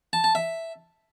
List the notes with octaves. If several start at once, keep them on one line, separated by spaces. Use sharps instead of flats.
A5
A5
E5